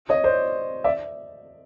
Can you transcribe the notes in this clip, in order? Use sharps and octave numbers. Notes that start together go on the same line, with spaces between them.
C#5 D#5
C5 D5
D5 E5